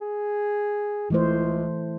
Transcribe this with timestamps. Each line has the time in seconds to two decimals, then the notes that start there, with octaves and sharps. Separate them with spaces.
0.01 G#4
1.10 C#2 E3 A3 C5